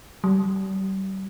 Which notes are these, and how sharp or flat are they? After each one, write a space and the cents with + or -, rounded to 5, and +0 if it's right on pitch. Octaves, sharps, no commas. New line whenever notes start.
G3 -35